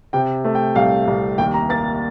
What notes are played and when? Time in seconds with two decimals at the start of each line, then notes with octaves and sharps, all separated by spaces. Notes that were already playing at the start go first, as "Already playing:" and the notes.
0.13 C3 G5
0.44 A3
0.55 G5
0.75 C2 F5
1.07 C2
1.38 D#2 G5
1.54 A#5
1.69 A#3 A6